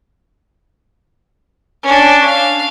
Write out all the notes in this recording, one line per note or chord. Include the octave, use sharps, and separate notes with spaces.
C#4 D4
F5